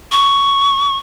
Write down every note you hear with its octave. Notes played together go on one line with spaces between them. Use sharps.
C#6